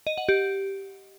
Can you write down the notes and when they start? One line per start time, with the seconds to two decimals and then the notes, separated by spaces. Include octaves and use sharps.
0.07 D#5
0.18 F#5
0.29 G4